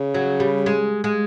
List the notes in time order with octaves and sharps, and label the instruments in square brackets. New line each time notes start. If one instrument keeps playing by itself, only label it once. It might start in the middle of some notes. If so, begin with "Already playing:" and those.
Already playing: [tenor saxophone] C#3
[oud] F#3
G3
G#3
G#3